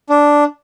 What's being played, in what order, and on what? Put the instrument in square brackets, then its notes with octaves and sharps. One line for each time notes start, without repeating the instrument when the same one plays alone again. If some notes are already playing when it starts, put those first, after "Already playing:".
[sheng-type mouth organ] D4